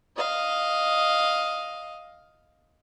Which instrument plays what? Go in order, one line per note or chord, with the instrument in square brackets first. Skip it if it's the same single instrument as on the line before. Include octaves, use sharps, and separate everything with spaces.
[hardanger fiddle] D#5 F5